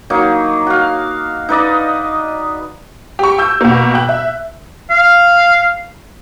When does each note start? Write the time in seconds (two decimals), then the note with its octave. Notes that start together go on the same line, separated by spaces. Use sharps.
0.10 F#3 A#3 D#4
0.67 F#4 F5
1.49 D#4 B4 D5 D#5
3.19 G4 C#6
3.38 E6 G6
3.61 B2 A#3
3.94 G5 F#6
4.09 E5
4.90 F5